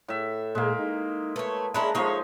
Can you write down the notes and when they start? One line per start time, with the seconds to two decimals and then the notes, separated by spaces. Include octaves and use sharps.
0.08 A2 E5
0.55 A#2 G#3 A#3
0.79 D#4
1.36 A3 B4 C#5
1.74 G#3 C#4 D4 E4 A#5
1.95 F3 G#3 A3 D#4 C#5